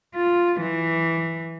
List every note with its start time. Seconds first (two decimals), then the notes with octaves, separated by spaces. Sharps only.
0.16 F4
0.61 E3